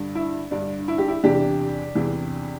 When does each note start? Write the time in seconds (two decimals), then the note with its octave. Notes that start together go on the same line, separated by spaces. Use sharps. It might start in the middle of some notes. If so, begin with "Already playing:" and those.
Already playing: G2 D3
0.15 E4
0.51 G2 D3 D4
0.88 E4
0.98 G4
1.08 E4
1.23 E2 C3 E3 D4 G4
1.95 E2 C3 E3